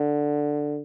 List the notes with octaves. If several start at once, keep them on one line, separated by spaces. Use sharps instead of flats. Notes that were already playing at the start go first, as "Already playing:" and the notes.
Already playing: D3